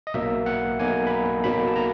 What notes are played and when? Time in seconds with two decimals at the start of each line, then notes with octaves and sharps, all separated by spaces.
0.07 D#5
0.14 B1 B2 F#3 A#3 E5
0.46 F#5
0.79 B1 B2 F#3 A#3 G#5
1.07 B5
1.11 A#5
1.44 B1 B2 F#3 A#3 B5
1.68 A5
1.76 A#5